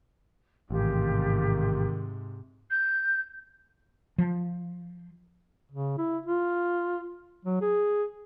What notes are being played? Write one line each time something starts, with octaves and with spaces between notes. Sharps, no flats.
A1 G#2 C3 D#3 F4 G4
G6
F3
C#3
E4
F4
F#3
G#4